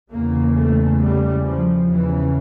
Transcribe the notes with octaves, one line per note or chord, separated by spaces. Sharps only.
E2 C#3 A#3
A3
G3
F3
E2 C#3 E3